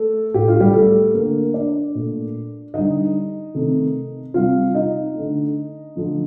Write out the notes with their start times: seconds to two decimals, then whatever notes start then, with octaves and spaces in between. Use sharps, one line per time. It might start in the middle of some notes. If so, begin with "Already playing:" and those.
Already playing: A3 A4
0.34 A2 A3 G4
0.48 F4
0.60 G3 G4
0.74 A3 A4
1.14 D3 A3 A#3 A#4
1.54 D4 D5
1.95 A#2 A3
2.74 D3 G3 D#4 D#5
3.55 C3 D#3 A3
4.34 C3 G3 F4 F5
4.74 D#4 D#5
5.14 A3
5.19 D3
5.95 D3 F3 A3